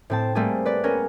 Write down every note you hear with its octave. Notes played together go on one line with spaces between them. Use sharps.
A2 C4 A5
G3 A3 A#3 C4 G#4
B4 D5
B3 C#4 G#4 A#4